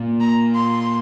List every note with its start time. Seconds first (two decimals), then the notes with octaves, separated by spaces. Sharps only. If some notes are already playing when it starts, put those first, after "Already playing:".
Already playing: A#2 A#3
0.21 A#5
0.55 C6